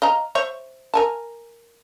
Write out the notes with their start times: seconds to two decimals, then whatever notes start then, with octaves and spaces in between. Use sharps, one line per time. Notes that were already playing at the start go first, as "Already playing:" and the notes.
0.02 D#5 F5 A#5
0.35 C5 C#5 E5
0.94 A#4 G#5 A5